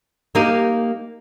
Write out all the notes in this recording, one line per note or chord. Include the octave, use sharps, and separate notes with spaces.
A#3 D#4 G4